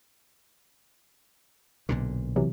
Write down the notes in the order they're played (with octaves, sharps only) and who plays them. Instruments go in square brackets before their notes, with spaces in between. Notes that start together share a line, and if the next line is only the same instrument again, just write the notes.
[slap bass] B1 A#2 D3
[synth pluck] C3 E3 F#3